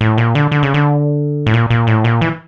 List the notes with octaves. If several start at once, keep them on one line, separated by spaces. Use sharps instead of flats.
A2
A#2
D3
D3
C#3
D3
A2
A#2
A#2
A2
A#2
E3